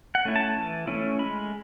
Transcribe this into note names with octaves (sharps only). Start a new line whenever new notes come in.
F#5
A3 C#4 E4
A5
E3
A3 C#4 E4
G#3 B5